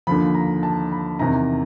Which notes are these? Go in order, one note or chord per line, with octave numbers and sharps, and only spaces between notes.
D#2 D3 F3 B5
A#5
A5
B5
E2 C3 D#3 A#5